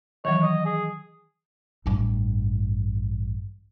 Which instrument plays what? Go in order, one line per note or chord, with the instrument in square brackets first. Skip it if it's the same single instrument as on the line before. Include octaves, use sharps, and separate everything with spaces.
[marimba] D#3 E3 F#3 [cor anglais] C#5
[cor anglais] D#5
G#4
[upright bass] A1 G2